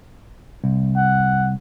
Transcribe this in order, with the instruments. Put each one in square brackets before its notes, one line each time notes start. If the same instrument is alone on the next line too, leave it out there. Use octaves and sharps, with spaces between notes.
[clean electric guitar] C2
[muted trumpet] F#5